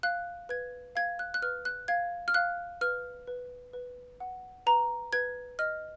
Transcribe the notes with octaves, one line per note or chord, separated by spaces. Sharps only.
F5 F#6
B4 G#6
F5 G#6
F#6
F#6
B4 F6
F#6
F5 G#6
F6
F5 F#6
B4 F6
B4
B4
F#5
B4 A#5
B4 G#6
D#5 F6